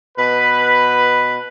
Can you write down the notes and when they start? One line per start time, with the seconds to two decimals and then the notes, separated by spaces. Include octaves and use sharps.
0.17 B2 B4